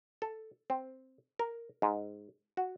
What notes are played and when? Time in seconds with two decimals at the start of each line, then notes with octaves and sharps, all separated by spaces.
0.22 A4
0.70 C4
1.39 A#4
1.82 G#2
2.57 F#4